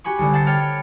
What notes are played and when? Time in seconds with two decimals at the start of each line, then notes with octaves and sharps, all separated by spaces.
0.04 F#4 G4 G#5 B5 C#6
0.19 C2 D3 G3
0.33 F#5 A5 B5 G6 A6 C7
0.46 C#5 G5 F6 A6
0.60 C#7